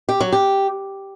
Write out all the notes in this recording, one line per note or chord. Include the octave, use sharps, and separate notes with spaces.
G4
F#3
G4